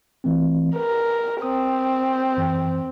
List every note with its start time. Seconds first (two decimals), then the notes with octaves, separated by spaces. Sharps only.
0.24 E3 A3 C4
0.76 A#4 B4
1.42 C4 D#6
2.37 F#2 E3